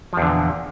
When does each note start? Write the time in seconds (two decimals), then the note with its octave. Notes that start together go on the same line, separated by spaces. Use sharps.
0.13 F3
0.17 E2
0.22 D3
0.27 A#2